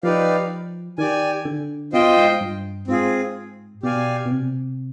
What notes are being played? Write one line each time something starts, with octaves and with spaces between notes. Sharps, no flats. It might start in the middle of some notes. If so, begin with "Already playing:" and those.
F3 D#4 G4 B4 D5 F5
D#3 G4 D5 G#5
D3
B2 F4 C5 D#5 G5
G#2
G2
G#2 C4 F4 G#4
B2 G4 D5 F5 G#5
B2
C3